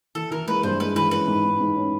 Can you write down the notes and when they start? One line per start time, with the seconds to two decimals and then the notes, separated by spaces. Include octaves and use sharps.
0.15 E3 A4
0.31 E3 A#4
0.48 G#3 B4
0.63 G2 C5
0.80 G#3 B4
0.95 E3 B4
1.11 C#4 B4
1.28 G#2
1.44 G#2
1.60 G#2
1.76 C#4